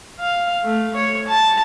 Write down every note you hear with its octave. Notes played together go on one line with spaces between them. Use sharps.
F5
A3
C#5
A5